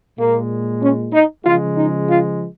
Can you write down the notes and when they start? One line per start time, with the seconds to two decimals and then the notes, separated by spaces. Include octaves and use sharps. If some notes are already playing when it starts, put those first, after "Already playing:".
0.18 A#2 G#3 A#3
0.81 C#4
1.13 D#4
1.44 C#3 F3 G#3 F4
1.76 D#4
2.08 F4